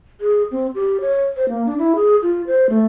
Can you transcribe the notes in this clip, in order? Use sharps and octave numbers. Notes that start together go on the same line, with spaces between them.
G#4
C4
G4
C#5
C5
A#3
D4
E4
G#4
F4
C5
A3